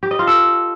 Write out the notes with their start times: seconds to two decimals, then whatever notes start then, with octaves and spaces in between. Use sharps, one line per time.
0.03 G4
0.11 D#5
0.19 F4
0.27 A4